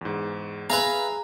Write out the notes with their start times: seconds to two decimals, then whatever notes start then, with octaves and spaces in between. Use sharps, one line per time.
0.01 E2 G#2
0.70 G#4 B4 E5 F5 A#5